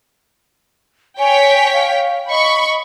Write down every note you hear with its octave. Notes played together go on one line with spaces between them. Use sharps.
C#5 G5 G#5 B6
F5
D#5 B5 C#6